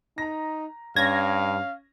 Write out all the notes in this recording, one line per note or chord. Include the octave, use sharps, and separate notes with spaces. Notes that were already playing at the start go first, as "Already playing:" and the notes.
D#4 A#5 A#6
G2 C#4 F5 G#6 A#6